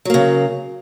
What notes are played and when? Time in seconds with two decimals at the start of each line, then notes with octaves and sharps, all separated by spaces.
0.05 F#3
0.10 A#3
0.14 C#3